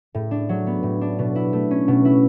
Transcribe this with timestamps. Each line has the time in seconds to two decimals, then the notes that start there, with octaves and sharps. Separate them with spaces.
0.15 A2
0.31 D4
0.49 F#3
0.67 B3
0.83 A2
1.01 D4
1.19 B2
1.35 E4
1.53 A3
1.71 C#4
1.88 B2
2.05 E4